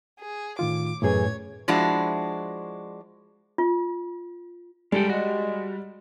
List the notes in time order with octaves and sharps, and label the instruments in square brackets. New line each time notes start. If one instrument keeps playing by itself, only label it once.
[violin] G#4
[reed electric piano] A2 D#3 F4 [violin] D6
[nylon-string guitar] F#2 E3 G#4 [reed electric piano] A2 [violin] C#5 G#6
[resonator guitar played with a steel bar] F3 G#3 D4 E4 F#4
[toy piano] F4
[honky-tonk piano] G3 [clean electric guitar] G#3 A4 G5
[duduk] G#3 [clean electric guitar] F#4